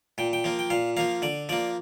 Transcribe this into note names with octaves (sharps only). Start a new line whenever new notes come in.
A#2 G5
G5
F3 A#3
G5
A#2 F5
F3 A#3 F5
D3 D5
F3 A#3 D5